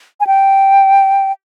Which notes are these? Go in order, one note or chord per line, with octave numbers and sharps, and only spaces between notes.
G#5
G5